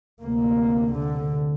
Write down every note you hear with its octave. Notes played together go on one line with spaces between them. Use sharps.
D2 C3 A#3
D3